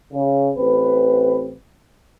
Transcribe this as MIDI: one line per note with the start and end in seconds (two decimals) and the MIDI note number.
0.13 0.49 49
0.56 1.53 33
0.56 1.53 60
0.56 1.53 71